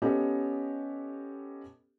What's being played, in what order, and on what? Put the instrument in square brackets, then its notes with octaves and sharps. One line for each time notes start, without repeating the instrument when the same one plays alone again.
[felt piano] B3 C#4 G4 A4 D#5